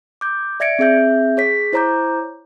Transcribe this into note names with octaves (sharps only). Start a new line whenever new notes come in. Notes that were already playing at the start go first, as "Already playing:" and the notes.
D6 G6
D5 E5 G#6 A#6 C#7 D7
C4 G#4 E5 G6
G#4 C#5 B6
E4 C5 C#5 A#5 D6 G6